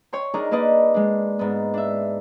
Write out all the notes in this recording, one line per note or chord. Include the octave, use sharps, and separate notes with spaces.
C#5 G5 C6
D4 D#4 G#4 A#4
A#3 D4 B4 D5 D#5
G#3 D4
G#2 B3
D4 E5